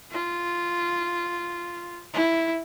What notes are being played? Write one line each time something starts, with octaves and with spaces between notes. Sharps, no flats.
F4
E4